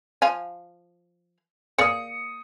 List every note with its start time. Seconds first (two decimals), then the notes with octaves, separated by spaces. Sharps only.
0.22 F3 F5 G#5
1.78 A#3 G#4 D5 D#6 C#7